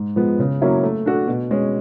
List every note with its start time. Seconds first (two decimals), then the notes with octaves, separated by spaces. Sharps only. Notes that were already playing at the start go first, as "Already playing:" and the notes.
Already playing: G#2
0.16 F3 G#3 B3
0.39 C#3
0.62 F#3 A#3 C#4 E4
0.83 A3
1.06 D4 F#4 A4
1.27 B2
1.51 G#3 C#4